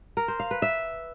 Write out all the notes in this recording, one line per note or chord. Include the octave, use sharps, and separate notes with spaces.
A#4
C5
F5
B4
E5